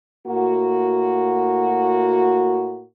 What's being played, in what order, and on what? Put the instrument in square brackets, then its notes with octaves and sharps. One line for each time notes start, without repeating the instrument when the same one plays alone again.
[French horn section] A2 A#3 F#4